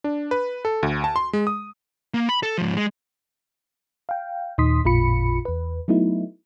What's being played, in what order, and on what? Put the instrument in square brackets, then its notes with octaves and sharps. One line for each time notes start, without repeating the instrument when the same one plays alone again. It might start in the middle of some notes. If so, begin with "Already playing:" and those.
[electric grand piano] D4
B4
A4
D2
A5
C6
G#3
D#6
[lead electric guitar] A#3
B5
A4
G#2 F3
G#3
[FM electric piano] F5 G5
D#2 A#2 D#4 C6 D#6 B6
A1 F2 A#2 F4 B5 C#7
E2 B4
F#3 A3 B3 D#4 E4